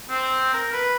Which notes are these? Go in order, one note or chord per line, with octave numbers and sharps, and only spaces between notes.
C4
A#4
B4